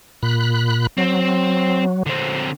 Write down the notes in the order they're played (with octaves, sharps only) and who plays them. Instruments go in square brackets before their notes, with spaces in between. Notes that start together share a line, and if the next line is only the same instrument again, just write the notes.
[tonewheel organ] A#2 B5 F#6
[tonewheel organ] F#3 [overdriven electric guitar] C4
[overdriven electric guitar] D3 C4